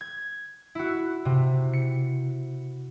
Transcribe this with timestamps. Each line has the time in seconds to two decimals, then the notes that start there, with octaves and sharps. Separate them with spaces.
0.01 G#6
0.75 E4 F#4
1.25 C3
1.73 C#7